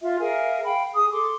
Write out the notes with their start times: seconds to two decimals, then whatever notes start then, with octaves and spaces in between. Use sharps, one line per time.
0.01 F4 E5
0.19 G#4 A#4 E5 F5
0.64 F5 G5 B5
0.93 G#4 D#6
1.11 A4 C6 D6